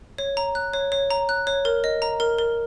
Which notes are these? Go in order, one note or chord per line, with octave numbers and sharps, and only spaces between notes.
C#5
A#5
F#6
C#5
C#5
A#5
F#6
C#5
A#4
D#5
A#5
A#4
A#4